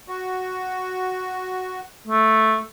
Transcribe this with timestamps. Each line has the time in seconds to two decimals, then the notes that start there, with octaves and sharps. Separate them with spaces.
0.08 F#4
2.07 A3